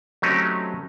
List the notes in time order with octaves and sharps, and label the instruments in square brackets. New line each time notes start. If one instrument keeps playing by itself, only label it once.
[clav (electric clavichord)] F#3 A3 C4 C#4 D#4 G4